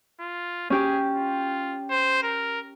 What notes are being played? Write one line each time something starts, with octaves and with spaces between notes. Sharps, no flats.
F4
C#4 G4 G#4
F4
C5
A#4